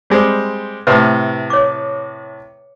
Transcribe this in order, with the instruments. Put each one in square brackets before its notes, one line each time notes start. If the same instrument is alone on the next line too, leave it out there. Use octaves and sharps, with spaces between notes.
[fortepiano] G3 G#3 C4
[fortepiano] A2 C3 [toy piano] B4 C6
[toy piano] C#5 D6